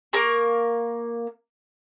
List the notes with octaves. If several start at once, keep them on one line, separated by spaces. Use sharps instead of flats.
A#3 A#4 C#6